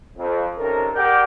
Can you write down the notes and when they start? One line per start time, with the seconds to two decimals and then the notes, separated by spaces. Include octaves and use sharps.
0.18 F2
0.58 C3 D#3 C#4 A4 A#4
0.95 G4 G#4 A#4 D5 F#5 G5